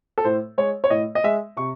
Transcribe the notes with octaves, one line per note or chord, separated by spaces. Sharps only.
A4
A2 C5
G#3 C#5
C#5
A2 D#5
D#5
G#3 E5
C3 C#6